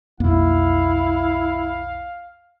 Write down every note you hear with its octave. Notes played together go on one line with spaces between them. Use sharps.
B1 F2 A#3 E4 F5